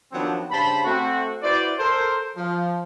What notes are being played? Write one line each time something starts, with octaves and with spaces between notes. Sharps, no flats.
D#3 F3 F#3 B3 C4 D4
G2 C#3 C5 A5 B5
A3 C4 F#4
E4 F#4 B4 C5 D5
A4 A#4 C5
F3